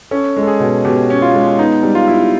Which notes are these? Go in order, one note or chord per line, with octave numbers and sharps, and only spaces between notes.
C#4 A4
G#3
A4
G#4
B2
B2 G4
C#4
F4
G#3
B3 D#4
G3
F4
E4